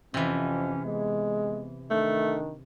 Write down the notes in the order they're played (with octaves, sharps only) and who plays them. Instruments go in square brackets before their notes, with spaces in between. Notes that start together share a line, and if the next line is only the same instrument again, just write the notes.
[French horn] F2 [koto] C3 E3 [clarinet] C#4
[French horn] G#3 [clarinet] B3
[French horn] D#3 [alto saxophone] A3 [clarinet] D4